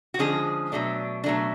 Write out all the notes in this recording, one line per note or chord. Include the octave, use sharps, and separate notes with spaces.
F#4
D3 F3 G#3 C#4 G#4
B2 F#3 A3 D4
B2 F#3 A3 D4